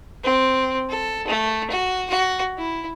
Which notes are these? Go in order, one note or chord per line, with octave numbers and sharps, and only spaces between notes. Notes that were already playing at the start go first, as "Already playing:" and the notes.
C4
A4
A3
F#4
F#4
E4